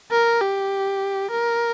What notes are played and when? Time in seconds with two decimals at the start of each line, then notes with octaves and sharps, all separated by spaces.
0.11 A#4
0.41 G4
1.31 A#4